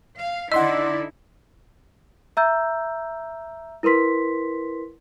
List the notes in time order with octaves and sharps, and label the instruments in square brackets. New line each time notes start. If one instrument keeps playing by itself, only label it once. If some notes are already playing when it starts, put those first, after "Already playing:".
[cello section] F5
[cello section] D3 D#4 E4 [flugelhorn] D5 [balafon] D#5 [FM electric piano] F#5 C6 E6
[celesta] E5 A#5 E6 G6
E4 A#4 B4 C6 B6